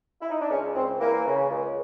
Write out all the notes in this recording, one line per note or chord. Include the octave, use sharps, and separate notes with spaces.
E4
D#4
D4
C#2 C#4
C#2 C4
E3 A#3
C#3
C#2